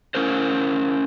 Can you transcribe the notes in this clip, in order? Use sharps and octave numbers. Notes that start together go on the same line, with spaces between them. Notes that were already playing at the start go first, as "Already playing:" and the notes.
C#4 E4 A#4 C5